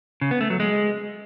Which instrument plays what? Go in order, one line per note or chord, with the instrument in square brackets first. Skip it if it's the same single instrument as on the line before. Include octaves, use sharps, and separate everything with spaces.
[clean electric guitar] C#3
B3
A3
F#3
G#3